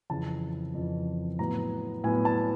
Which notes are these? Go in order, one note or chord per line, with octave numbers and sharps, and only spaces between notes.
F2 C#3 E3 A5
F2 C#3 E3
A2 F#3 B3 A#5
A2 F#3 B3 G#5
A5